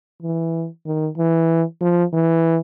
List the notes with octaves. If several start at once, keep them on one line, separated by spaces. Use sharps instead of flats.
E3
D#3
E3
F3
E3